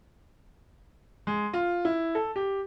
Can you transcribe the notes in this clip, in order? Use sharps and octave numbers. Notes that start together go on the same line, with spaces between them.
G#3
F4
E4
A4
G4